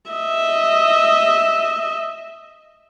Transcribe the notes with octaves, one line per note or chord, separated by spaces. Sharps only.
D#5 E5